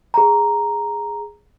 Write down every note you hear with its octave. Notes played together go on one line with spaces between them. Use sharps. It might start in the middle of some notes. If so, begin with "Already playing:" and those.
G#4 A#5